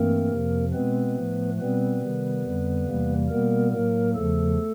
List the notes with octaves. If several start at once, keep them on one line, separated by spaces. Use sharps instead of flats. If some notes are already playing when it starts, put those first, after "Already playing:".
Already playing: G2 E3 A3 A#3 C4 A#4
F2 C3 F3
B2 G#3 B3 C4 B4
A2 F3 A3
B2 G3 B3 C4 B4
C3 D#3 G3
F2 D3 G3
E2 C3 E3 G3 A#3
B2 G3 A#3 B3 A#4
A2 F#3 A#3 A#4
E2 C#3 F3 A3 A4